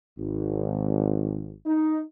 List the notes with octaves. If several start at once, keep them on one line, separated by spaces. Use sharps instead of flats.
G#1
D#4